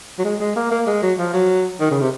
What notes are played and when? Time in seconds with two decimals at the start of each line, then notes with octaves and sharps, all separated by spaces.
0.19 F#3
0.24 G#3
0.40 G#3
0.56 A#3
0.71 A#3
0.87 G#3
1.02 F#3
1.18 F3
1.33 F#3
1.80 D#3
1.91 C#3
2.00 C3